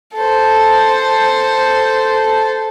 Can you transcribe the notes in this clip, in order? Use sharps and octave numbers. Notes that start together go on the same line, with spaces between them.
A4 C5